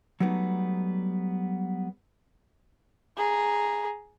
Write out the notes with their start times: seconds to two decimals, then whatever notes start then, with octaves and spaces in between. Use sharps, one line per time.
0.20 F#3 G3 A3 B3 D#4
3.17 G#4 A#5